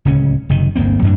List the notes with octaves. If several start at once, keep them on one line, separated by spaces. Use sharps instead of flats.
D1 C#2 C#3 C#4
F#1 C3 D#3
G1 D2 A#3 C4
F#2 A2 A#3 D4